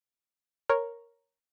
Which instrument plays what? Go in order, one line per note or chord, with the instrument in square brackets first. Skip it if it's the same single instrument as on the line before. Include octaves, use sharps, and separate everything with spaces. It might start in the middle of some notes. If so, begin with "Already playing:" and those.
[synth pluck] A#4 C#5